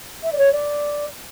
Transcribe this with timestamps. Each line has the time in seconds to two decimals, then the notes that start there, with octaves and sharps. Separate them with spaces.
0.23 E5
0.32 D5
0.38 C#5
0.52 D5